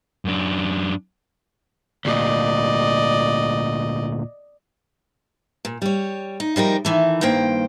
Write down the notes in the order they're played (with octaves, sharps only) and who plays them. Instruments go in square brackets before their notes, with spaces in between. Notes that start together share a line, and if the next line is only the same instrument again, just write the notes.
[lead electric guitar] F#2 D4
[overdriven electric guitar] D2 A#2 [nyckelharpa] D5 D#5
[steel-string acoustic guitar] A#2
G3 C#5
D#4
F3 G3 D#4 A#4
D#3 E3 A3
G2 D#3 A#3 C5 G5